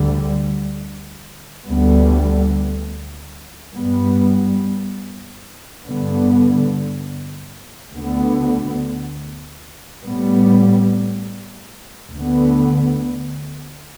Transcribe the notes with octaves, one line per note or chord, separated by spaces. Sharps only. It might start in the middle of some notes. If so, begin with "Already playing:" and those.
Already playing: D2 D3 G3
D2 D3 G3 B3
G2 G3 B3
G2 D3 B3
D2 D3 B3
A2 G3 B3
D2 D3 B3